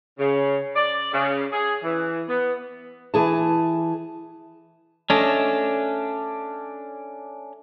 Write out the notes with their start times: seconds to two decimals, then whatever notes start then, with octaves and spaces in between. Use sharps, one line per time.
0.19 C#3
0.76 D5
1.13 C#3
1.52 G#4
1.84 E3
2.28 B3
3.14 E3 G#4 A5
5.10 A3 C#4 D4 D#5 E5